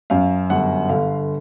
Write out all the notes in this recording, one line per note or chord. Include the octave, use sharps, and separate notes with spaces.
F#2 F5
G1 F#5
D3 F5